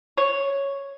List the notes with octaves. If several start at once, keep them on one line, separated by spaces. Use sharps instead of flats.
C#5